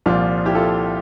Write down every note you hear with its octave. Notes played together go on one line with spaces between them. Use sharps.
C2 A#2 F3 F4
E4 G4
F4 A4